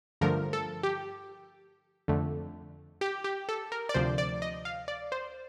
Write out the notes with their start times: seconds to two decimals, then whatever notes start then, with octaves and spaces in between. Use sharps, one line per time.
0.21 G2 D3 F3 A3 A#4
0.53 A4
0.83 G4
2.08 F2 D3 A3
3.01 G4
3.24 G4
3.49 A4
3.72 A#4
3.89 D5
3.94 D2 C3 F3 C5
4.18 D5
4.42 D#5
4.65 F5
4.88 D5
5.12 C5